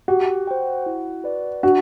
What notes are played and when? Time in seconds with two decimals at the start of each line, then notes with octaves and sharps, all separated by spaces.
0.08 F#4 G4
0.47 C5 G5
0.86 E4
1.24 B4 D5
1.63 D4 F#4